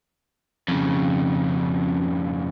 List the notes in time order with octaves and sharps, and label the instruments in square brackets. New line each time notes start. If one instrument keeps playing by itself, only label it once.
[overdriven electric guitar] F2 C#3